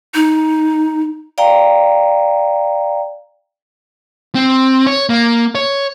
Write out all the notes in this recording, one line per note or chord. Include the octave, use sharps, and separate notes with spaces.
D#4
D5 F5 G5 A#5
C4
C#5
A#3
C#5